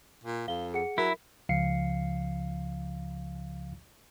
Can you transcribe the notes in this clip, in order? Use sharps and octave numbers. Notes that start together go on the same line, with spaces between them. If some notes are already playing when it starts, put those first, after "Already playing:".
A#2
F2 F5 G7
G#4 F#5 C#7
F#3 E4 A#4
C#2 C#3 F3 F5 C7 C#7